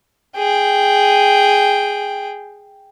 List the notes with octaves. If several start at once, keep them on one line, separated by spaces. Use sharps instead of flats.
G#4 G5